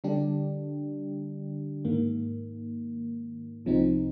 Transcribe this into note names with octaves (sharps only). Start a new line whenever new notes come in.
D3 G3 D4 G4
G#2 D#3 A#3
C2 C3 F3 C4 D#4